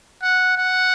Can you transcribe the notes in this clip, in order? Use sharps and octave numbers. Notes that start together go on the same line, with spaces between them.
F#5
F#5